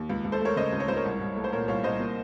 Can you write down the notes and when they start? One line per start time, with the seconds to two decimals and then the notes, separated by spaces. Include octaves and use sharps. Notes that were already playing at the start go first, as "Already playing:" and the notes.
Already playing: D#2
0.09 C#2
0.24 C#2
0.32 A4 C5
0.41 A3 A#4 C#5
0.56 C#3 C5 D#5
0.72 C#2
0.80 C#5
0.88 C#2 C5
0.96 A#4 C#5
1.05 C2
1.20 C2
1.36 A3
1.44 C5
1.52 A#2 A#4 C#5
1.68 C2 C#5 F5
1.84 C2 C5 D#5
2.00 A#3